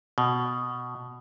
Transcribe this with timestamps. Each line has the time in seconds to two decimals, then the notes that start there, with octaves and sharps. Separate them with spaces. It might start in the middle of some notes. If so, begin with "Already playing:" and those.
0.18 B2